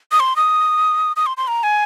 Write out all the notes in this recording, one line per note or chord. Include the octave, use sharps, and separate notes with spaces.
D#6
C6
D#6
D#6
C6
C6
A#5
G#5